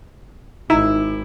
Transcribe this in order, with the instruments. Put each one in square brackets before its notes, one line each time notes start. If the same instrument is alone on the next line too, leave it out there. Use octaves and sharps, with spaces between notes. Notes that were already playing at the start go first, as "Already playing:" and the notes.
[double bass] G#1 [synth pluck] D#4 [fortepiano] E4